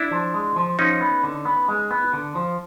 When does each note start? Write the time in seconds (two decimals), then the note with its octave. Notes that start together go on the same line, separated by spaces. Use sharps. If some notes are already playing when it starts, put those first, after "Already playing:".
Already playing: D4 E4
0.11 F3
0.34 G#3
0.56 F3
0.79 F3 C#4 D#4
1.01 B3
1.24 D3
1.45 B3
1.68 G#3
1.91 B3
2.13 D3
2.35 F3